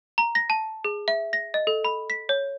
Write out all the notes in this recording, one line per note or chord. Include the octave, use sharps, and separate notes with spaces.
A#5
A#6
A5
G#4
E5
A#6
D#5
A4
B5
B6
C#5